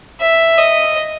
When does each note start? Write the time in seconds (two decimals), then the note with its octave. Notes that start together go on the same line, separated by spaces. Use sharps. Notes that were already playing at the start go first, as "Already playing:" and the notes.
0.21 E5
0.58 D#5